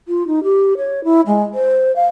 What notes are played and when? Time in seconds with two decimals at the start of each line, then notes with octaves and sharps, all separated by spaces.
0.08 F4
0.28 D#4
0.44 G4
0.78 C#5
1.04 E4
1.27 G#3
1.54 C5
1.96 F5